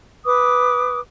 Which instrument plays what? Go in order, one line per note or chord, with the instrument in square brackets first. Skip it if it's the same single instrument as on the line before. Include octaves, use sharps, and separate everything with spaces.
[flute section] B4 D6 D#6